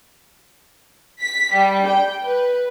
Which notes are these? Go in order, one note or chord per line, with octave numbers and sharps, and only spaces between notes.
B6
G3
G5
B4